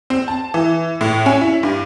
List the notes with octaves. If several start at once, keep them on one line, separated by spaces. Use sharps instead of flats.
C4
A5
E3
A2
C#4
E4
G2